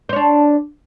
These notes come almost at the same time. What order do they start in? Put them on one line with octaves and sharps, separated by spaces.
C5 C#5 D4